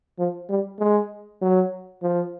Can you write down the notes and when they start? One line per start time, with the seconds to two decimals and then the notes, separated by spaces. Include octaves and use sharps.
0.19 F3
0.50 G3
0.79 G#3
1.42 F#3
2.03 F3